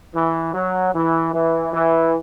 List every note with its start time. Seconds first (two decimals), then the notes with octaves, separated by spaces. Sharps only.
0.14 E3
0.53 F#3
0.93 E3
1.33 E3
1.73 E3